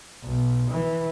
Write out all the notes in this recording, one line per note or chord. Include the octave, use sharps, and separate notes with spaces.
B1
E3